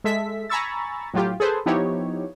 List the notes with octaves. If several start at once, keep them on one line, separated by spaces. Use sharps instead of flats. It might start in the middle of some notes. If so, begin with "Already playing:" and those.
G#3 A4 E5 B6
G#5 A#5 B5 C#6 E6 A6
A2 F#3 F4 G4
G#4 A4 B4 C5
F3 B3 D#4 E4 G4 C#5